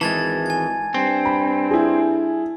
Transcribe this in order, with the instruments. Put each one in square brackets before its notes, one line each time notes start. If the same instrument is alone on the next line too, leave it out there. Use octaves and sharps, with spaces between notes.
[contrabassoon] G#1 [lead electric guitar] E3 G#3 [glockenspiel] A5 G#6 A6
[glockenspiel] G#5 G#6
[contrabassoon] G2 [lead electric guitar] C4
[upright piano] B5
E4 G#4